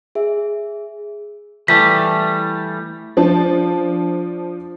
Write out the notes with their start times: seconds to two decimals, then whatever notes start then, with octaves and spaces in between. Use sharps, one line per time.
0.15 G#4 E5
1.68 E3 G3 A3 B6
3.17 F3 D4 A5